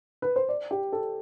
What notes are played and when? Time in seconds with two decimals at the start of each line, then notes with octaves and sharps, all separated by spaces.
0.22 B4
0.36 C5
0.49 D5
0.71 G4
0.92 A4